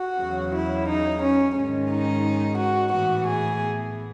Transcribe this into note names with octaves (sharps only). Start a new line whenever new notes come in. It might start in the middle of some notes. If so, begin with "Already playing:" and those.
Already playing: F#4
E2 C#3 F#3
E4
D#4
C#4
G#2 D#3 G#3 C#4
D#4
F#4
A2 E3 B3 F#4
G#4